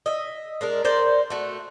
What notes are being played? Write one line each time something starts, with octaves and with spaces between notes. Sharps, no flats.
D#5 E5
G#3 D4 A#4
A#4 C5 D5 G5
A3 F#4